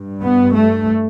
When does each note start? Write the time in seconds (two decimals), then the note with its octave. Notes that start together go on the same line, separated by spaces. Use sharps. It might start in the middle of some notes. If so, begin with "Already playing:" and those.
Already playing: G2
0.22 B3
0.54 A3